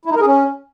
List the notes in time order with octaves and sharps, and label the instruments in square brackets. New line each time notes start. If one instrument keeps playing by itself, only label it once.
[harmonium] E4
D#4
A#4
G#4
C#4